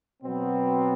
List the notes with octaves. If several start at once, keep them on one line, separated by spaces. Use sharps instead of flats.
B2 F#3 B3 C4